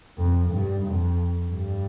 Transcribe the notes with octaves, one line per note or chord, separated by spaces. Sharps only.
F2
G2
F2
G2